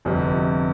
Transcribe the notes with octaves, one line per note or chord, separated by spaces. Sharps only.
G1 F2 C3